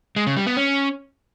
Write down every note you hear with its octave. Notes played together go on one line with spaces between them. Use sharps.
G#3
C#3
G3
B3
C#4